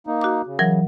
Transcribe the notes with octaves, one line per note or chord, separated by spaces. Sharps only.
A#3 D#4
F#4 D6
C#3
E3 F#3 A#4